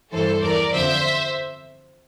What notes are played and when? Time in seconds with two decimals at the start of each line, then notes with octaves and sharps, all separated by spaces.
0.12 G2 E3 A4 C5
0.42 E2 E3 A#4 D5
0.72 F2 D3 F3 C5 E5